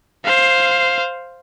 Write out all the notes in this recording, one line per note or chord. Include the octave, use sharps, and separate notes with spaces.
C5 F5